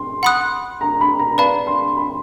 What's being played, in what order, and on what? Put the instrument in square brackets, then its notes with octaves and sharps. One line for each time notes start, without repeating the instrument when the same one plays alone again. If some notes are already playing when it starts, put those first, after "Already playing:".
Already playing: [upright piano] C6
[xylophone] F#5 B5 D#6 F#6
[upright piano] A#5
B5
A#5
[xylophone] B4 D5 F5 A5 [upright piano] B5
[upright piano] C6
B5